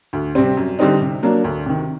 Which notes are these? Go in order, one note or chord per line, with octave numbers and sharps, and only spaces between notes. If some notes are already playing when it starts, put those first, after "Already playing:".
D2
C3 G3 C4
F#2
D3 G3 C4 D#4
C3
F#3 A#3 D4
D2
C3 D#3